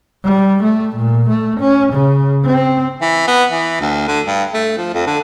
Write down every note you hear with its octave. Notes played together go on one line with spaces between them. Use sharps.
G3
A3
A#2
A3
C#4
C#3
C4
E3
B3
E3
D2
D3
G2
A3
F3
F2
D3